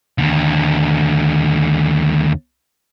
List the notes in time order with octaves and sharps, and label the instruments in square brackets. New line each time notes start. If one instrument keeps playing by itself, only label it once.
[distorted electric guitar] D#2 D3